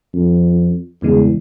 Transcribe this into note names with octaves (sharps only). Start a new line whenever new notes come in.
F2
E2 G2 C#3 G#3